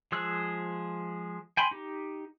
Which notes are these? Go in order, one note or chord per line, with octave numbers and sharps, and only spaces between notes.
F3 G#3 G#4 E6 F#6
G5 G#5 B5 C6
D#4 G4